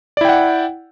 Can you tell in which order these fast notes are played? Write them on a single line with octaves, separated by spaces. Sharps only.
D5 E4 G5 F#5